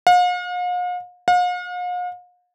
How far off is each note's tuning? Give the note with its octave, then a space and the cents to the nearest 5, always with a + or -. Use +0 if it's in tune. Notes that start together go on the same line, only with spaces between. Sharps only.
F5 +45
F5 +45